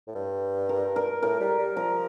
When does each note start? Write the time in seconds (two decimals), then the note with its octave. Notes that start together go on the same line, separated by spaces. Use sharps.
0.08 A2
0.15 G2
0.69 A#4
0.96 A#4
1.23 A2 A#4
1.40 G3
1.59 G3
1.77 F3 A#4